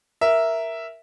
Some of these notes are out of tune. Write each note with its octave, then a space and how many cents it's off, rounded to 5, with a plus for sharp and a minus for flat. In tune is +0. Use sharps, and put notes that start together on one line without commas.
A#4 +0 E5 +0